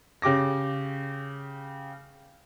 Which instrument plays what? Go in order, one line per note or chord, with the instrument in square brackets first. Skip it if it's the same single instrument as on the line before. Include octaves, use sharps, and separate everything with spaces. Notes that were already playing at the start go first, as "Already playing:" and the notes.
[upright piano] C#3 G4 D6 A#6